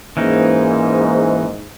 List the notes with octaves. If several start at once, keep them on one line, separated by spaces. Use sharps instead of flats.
G#2 E3 A#3 C#4 D#4